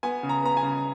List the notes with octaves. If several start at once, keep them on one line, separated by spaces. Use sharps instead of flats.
B3 G#5
C#3
A#5
B3 A#5
G#5
C#3